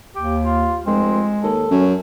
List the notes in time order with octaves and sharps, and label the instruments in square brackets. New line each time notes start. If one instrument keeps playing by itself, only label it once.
[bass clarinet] D#2 [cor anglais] G4
[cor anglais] F4
[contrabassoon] F1 [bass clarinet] G#3 [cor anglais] C4
[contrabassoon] D#2 [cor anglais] A4
[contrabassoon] F#2 [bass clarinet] C#4